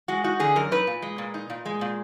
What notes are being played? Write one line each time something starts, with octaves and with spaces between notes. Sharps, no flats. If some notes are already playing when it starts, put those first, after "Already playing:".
G#3 F#4
D#4 F#4
D3 G#4
F#2 A#4
D#4 B4
A#2
G#3
A#2
D#4
A#2
G#3
A#2